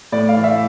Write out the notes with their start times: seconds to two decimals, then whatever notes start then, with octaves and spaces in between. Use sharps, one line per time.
0.12 A2 D5
0.29 F5
0.36 E3
0.44 E5